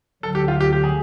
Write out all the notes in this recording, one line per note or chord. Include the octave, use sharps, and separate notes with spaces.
D2 D3 F#3 A4
G4
F4
G4
G4
G#4